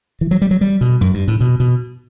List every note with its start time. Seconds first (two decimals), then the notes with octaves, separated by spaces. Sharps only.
0.21 E3
0.31 F#3
0.42 G3
0.51 F#3
0.61 G3
0.81 B2
1.01 F#2
1.14 G2
1.28 A2
1.41 B2
1.60 B2